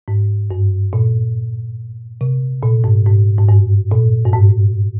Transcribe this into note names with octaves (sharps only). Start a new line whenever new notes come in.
G#2
G2
A#2
C3
A#2
G#2
G#2
G#2
G2
A#2
G2
G#2